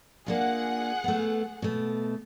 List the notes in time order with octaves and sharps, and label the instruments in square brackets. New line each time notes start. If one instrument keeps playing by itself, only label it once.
[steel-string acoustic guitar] A#3 D4 F4 [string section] G#4 F#5
[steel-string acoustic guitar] A3 B3
B2 A3